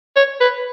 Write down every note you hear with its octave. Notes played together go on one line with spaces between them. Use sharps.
C#5
B4